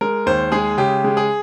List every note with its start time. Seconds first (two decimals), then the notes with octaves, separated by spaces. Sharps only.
0.01 G#3 A#4
0.26 D#2 C5
0.52 G#3 G#4
0.77 C#3 G4
1.04 G#3
1.17 G#4